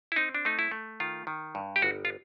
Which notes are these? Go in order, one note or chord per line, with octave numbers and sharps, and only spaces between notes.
E4
C4 D#4
D4
A3 D#4
E4
A3
D#3 F4
D#3
G2
G4
G1 F#4
F4